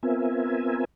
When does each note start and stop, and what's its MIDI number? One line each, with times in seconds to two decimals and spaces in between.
0.03 0.85 59
0.03 0.85 60
0.03 0.85 65
0.03 0.85 70
0.03 0.85 76
0.03 0.85 80